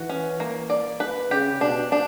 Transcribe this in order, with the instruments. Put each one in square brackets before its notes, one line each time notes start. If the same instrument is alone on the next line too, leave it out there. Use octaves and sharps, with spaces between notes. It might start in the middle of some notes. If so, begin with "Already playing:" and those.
Already playing: [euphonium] E3 [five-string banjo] F#4
[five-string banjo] C#4
A#3
D5
B4
[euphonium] C#3 [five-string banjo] G4
[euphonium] B2 [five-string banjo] D4
[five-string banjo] D4